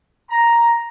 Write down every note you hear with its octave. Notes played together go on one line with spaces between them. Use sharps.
A#5